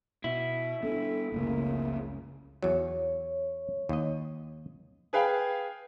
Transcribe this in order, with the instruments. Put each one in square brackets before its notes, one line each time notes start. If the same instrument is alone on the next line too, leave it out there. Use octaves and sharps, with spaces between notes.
[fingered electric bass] B2 [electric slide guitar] E4
[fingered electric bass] B3 C4 D4 [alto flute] A4
[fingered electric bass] F#1 A3 [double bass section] C#2 C#3 [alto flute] A#3
[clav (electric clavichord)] E2 F#3 [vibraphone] C#5
[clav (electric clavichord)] D#2 D#5
[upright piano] G#4 B4 F5 G5 G#5